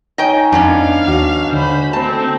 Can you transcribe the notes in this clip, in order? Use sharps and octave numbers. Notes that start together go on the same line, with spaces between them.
D#4 C#5 D#5 G5 G#5
F2 G#2 B3 C#4 D4 F5
D#2 F#4
D3 C5 B5
A3 C4 C5 A5 A#5